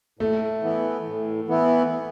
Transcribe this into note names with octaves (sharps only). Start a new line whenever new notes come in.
A2 A3
E3 B3 E4
A2
E3 B3 E4